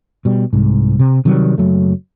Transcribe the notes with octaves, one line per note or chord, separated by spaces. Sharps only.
B2 G3
C2 G#2
C3
C3 D#3 F#3 G3
F#1 F#3 A3